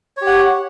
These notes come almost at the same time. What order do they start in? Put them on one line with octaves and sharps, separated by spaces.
C#5 G4 F#5